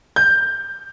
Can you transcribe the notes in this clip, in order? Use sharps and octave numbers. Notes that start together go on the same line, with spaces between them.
G6